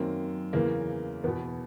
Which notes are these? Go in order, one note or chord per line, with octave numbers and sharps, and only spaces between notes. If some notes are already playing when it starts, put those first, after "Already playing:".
Already playing: F#2 D#3 A#3 C4
E2 C#3 E3 A#3
E2 B2 B3